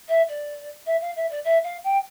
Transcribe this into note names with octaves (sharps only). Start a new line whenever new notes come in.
E5
D5
E5
F5
E5
D5
E5
F5
G5